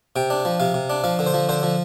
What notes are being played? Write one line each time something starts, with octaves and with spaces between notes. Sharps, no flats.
C3 G5
D4
F3
C3 F5
C3
D4
F3 F5
D3
C5
F3
D3 C5
F3